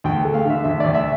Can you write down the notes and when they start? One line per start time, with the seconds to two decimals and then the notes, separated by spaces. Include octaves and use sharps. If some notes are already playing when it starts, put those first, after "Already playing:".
0.04 D2 G5
0.25 A3
0.34 F5
0.45 D3 E5
0.64 D2 E5
0.80 D2 D5
0.94 E5